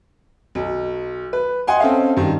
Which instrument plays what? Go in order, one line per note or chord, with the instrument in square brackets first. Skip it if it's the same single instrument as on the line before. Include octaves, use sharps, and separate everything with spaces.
[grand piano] B1
B4
D#5 F#5 G#5 C6
C4 C#4 A4 D#5 F5
G2 D#3